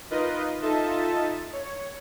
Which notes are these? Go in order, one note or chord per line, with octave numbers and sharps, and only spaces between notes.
D#4 F4 A#4 B4 D#5
D#4 F4 A4 D#5 E5 A5
C#5